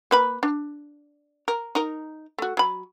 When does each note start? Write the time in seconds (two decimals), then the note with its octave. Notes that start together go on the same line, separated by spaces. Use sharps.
0.11 A#3 B4 B5
0.43 D4
1.48 A#4
1.75 D#4 A#4
2.38 A3 F#4
2.57 F#3 B5